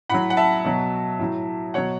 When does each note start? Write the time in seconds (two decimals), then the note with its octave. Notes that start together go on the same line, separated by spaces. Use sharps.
0.09 A2 F#3 F#5 B5
0.30 F#5
0.37 E5 A5
0.65 B2 F#3
1.19 A2 F#3
1.74 B2 F#3 C#5 F#5